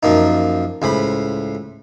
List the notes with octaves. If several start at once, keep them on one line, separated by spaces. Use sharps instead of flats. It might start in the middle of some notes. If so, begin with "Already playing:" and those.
F#2 F3 A#3 D#4
C#2 A2 C5 B5